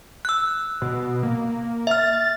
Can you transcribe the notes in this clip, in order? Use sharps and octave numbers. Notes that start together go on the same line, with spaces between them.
E6 F#6
B2
A#3
E5 F6 A6